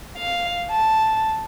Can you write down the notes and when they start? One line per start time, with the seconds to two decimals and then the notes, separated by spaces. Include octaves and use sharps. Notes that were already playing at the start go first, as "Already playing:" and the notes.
0.17 F5
0.71 A5